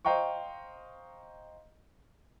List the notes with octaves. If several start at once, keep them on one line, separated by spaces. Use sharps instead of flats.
C5 D#5 F5 G5 A#5 C#6